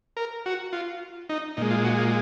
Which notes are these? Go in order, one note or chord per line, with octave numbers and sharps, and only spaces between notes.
A#4
F#4
F4
D#4
A#2 G#3 D#4
F4
F#4
F4